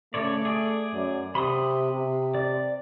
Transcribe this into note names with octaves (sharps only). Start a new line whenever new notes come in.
C#3 A3 C#5 D5
G#4 D5
F#2
C3 B5 C6 D#6
C3
D5